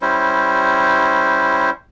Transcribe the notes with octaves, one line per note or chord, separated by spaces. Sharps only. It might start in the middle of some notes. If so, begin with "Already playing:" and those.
G3 C#4 E4 C5